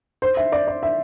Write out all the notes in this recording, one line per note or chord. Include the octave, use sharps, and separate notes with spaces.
C5
E5
D5
D5
E5